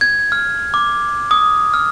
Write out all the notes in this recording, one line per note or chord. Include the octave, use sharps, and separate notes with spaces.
G#6
F6
D6
D#6
F6